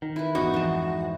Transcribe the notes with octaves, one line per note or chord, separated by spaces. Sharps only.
D#3
E4 B4
G#1 E2 D#4 F#4
F2 G#2 E3 A5